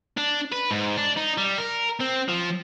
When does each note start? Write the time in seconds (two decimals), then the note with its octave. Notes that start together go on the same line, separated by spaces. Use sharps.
0.18 D4
0.52 B4
0.71 G#2
0.97 D4
1.16 D#4
1.38 G3
1.58 A#4
2.00 C4
2.28 F3